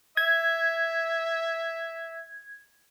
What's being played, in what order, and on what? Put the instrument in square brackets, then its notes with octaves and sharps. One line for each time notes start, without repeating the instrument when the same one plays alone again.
[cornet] E5 [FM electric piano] G#6